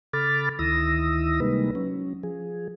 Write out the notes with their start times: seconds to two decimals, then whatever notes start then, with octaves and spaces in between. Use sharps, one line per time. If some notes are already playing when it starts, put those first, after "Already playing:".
0.13 C#3 A4 B5 D6 F6 A6
0.59 D2 D#3 E4 D#6 E6 A#6
1.40 C3 G3 G#3 A#3 D#4 B4
1.75 F#3 C#4
2.23 F3 G#4